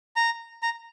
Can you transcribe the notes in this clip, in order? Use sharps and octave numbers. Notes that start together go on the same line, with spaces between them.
A#5
A#5